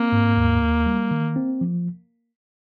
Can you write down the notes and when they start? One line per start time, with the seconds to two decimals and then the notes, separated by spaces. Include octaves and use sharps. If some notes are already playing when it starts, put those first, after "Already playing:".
Already playing: A#3 C4
0.12 G#2
0.37 D#2
0.62 D#2
0.86 G3
1.11 D#3
1.36 C4
1.61 F3